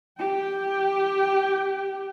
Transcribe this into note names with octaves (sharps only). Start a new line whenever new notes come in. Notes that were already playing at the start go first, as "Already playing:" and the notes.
G4 G5